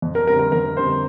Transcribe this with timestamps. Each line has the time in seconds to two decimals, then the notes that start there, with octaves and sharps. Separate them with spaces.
0.02 F2
0.15 A#4
0.27 D3 G3 C4 A#4
0.39 A#4
0.52 F2 A#4
0.77 D3 G3 C4 C5